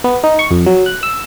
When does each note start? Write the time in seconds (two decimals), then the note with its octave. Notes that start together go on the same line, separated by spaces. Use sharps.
0.04 B3
0.24 D#4
0.39 C#6
0.51 F2
0.66 F#3
0.86 F#6
1.03 E6